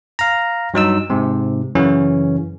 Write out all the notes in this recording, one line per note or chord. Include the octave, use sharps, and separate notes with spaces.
F5 A#5
G2 F#3 D#4 E6
G#2 C3
F#2 C#3 E3 C#4